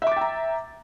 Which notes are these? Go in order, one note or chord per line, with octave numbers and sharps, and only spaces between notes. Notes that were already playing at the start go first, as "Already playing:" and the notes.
E5 G5 A#5 D6 A6